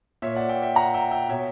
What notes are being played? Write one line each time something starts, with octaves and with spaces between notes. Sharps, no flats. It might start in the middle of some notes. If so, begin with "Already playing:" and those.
A#2 C#5 E5
D5 F#5
E5 G5
E5 G5
F#5 A#5
E5 G5
E5 G5
B2 C#5 E5